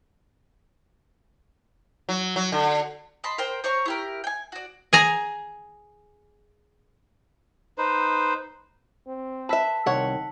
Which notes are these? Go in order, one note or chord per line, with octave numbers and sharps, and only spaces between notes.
F#3
F#3
D3
D#5 A5 B5 C6
A#4 C5 G5
C5 C#5 A#5 C#6
E4 G4 A#4
G5 G#5
F#4 D5
G#4 G#5 A#5
D#4 B4 C5
C4
B4 E5 A5 E6 B6
C2 D#3 C#5 F#5